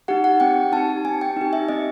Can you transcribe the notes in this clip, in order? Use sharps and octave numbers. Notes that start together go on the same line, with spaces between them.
D#4 G4 F#5
F#5
C4 G5
D#4 G4 A5
C4 G#5
G5
D#4 G4
E5
C4 D#5